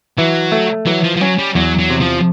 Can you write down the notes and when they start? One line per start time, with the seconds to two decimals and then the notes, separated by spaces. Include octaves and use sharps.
0.18 E3 F#3
0.52 A3
0.86 E3 F#3
1.04 F3
1.17 F3
1.21 F#3 C#4
1.38 G3
1.55 E2 F#3
1.79 F#3
1.90 C3
2.01 F3